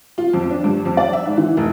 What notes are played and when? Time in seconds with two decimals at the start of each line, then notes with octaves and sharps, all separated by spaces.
0.18 F4
0.33 F2
0.51 D4
0.64 G2
0.85 F2
0.97 D5
1.13 E5
1.25 G#2
1.37 E3
1.57 F1